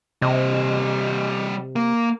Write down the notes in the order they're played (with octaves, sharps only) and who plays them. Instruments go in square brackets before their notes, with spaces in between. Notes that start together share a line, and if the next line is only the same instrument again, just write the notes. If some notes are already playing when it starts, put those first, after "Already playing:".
[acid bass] C3 [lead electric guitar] G3 D#5
[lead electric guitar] A#3